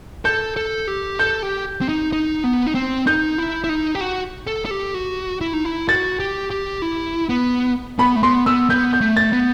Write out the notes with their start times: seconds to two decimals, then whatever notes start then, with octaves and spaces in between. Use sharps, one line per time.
0.25 A4 G6
0.56 A4
0.88 G4
1.19 A4 G6
1.43 G4
1.81 C4
1.89 D#4
2.13 D#4
2.44 B3
2.67 D#4
2.75 C4
3.07 D#4 G6
3.38 E4
3.64 E4
3.69 D#4
3.95 G4
4.01 F#4
4.47 A4
4.65 A4
4.71 G4
4.94 F#4
5.41 E4
5.53 D#4
5.65 E4
5.88 F#4 A6
6.20 G4
6.51 G4
6.82 E4
7.29 B3
7.99 B3 B5
8.16 A3
8.23 B3 C6
8.46 B3 E6
8.70 B3 G6
8.93 G6
9.01 A3
9.17 A6
9.33 B3